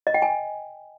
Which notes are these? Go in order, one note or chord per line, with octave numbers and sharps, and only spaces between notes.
D#5
G5
G#5